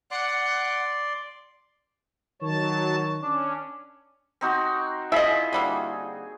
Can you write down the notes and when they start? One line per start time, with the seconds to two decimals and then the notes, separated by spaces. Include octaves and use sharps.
0.11 D5 F#5 C6
2.42 D#3 F#3 C#5 A5
3.22 C#4 D4
4.41 C4 D#4 F#4
5.12 E4 F4 G#4 D#5 E5 B5
5.53 D3 G3 A#3